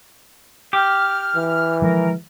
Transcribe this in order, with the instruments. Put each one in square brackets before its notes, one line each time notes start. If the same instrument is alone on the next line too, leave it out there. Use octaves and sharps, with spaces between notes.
[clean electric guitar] G4 [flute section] F6
[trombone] E3
[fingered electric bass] D#3 F3 G#3 [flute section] A#4